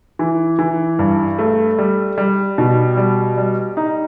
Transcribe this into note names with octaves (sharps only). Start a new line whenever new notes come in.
E3
E3
G2
A3
G3
G3
B2
G3
G3
D#4